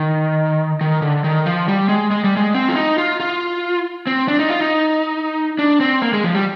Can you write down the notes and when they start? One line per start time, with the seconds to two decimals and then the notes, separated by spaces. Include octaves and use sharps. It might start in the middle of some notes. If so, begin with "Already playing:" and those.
Already playing: D#3
0.81 D#3
1.02 D3
1.24 D#3
1.46 F3
1.68 G3
1.89 G#3
2.11 G#3
2.24 G3
2.37 G#3
2.54 C4
2.69 F4
2.76 D#4
2.98 F4
3.20 F4
4.07 C4
4.28 D4
4.39 D#4
4.50 F4
4.60 D#4
5.59 D4
5.80 C4
6.02 A#3
6.13 G#3
6.24 F3
6.35 G3